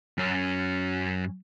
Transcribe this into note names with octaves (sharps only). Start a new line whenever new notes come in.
F#2 C#4